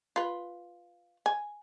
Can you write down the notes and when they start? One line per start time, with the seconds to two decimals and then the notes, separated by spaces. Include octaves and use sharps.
0.16 F4 B4
1.26 G#5